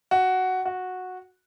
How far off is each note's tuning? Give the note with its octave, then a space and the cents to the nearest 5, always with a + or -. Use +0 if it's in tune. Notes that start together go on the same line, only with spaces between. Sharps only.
F#4 +5
F#4 -10